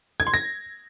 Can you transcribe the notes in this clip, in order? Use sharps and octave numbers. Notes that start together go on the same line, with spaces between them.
G#6
C6
A#6